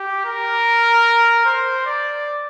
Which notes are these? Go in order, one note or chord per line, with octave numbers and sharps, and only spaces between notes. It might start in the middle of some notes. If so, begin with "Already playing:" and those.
Already playing: G4
A#4
C5
D5